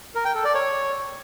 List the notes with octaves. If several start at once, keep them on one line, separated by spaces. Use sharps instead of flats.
A#4
G5
A4
D5
C#5